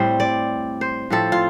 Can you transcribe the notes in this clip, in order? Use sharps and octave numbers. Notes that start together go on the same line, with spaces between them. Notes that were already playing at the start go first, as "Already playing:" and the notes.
Already playing: A2 G3 C4 C5
D5
C5
A2 F3 C4 A4
F4